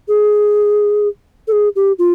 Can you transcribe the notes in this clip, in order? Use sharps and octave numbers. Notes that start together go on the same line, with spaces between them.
G#4
A4
G#4
G4
F4